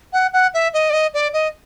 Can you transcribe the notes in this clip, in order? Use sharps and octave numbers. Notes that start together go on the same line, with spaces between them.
F#5
F#5
E5
D#5
D5
D#5
D5
D#5